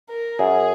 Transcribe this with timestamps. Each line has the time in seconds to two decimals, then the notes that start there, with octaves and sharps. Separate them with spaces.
0.10 A#4
0.39 F#2 G#4